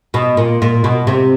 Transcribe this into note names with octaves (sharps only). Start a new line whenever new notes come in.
B2
A#2
A#2
B2
C3